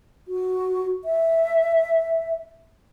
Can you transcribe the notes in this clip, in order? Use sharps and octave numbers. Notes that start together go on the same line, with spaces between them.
F#4
E5